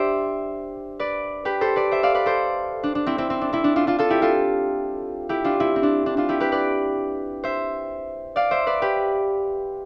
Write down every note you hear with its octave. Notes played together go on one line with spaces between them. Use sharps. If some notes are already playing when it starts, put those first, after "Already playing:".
Already playing: D4 G4 C5 D5 E5
B4 D5
G4 B4
A4 C5
B4 D5
C5 E5
D5 F5
B4 D5
A4 C5
D4
D4
C4 E4
C4 E4
C4
D4
C4 E4
D4
D4 F4
D4 F4
F4 A4
E4 G4
F4 A4
E4 G4
D4 F4
C4 E4
C4
D4
D4
D4 F4
E4 G4
G4 B4
B4 D5
C5 E5
D5 F5
C5 E5
B4 D5
G4 B4